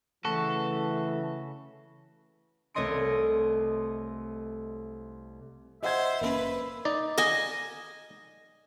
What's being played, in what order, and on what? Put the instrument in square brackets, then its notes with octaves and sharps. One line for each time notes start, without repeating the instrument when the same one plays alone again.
[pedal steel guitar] C#3 F#4 C#6 [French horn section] E3 [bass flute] A3 [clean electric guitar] A4
[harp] C2 A3 C#5 D#5 C6 D7
[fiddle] C5 [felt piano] D#5 F#5 G#6 [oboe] E5
[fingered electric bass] F#1 C#3 C#4 [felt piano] A#3 [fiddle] B4
[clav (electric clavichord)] D#4 D5
[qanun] D#5 G#5